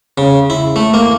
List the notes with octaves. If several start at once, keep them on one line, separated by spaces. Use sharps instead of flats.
C#3
E4
A3
A#3